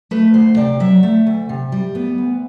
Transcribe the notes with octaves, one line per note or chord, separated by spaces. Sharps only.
A3 B4
D2 C5
C3 D5
F#3 E5
A3
D2
C3
G3
B3
D2